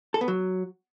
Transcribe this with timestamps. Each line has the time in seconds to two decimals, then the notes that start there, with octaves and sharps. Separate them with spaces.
0.14 A4
0.21 B3
0.28 F#3